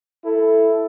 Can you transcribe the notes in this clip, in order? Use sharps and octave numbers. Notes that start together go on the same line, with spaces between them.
E4 A4